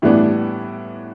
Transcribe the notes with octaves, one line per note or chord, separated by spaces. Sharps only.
A2 E3 G3 B3 D4